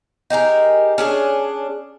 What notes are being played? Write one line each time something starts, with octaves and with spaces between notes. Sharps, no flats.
D#4 G4 G#4 A#4
C#4 D4 G#4